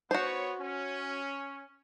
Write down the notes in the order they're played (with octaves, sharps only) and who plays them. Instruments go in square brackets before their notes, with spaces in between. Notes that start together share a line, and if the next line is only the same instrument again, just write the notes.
[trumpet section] B3 C#5 [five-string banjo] F#4 C5
[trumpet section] C#4